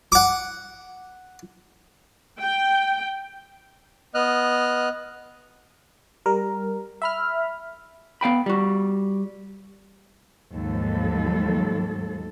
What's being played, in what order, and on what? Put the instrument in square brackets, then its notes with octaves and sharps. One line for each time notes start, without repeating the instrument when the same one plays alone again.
[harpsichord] F#5 D6
[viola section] G5
[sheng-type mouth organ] B3 D#5 F6 F#6
[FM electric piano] G3 A#4
E5 B5 F6
[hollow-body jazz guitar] B3 F5 G5 B5
G3 F#4
[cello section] D#2 G#2 F3 F#3 A4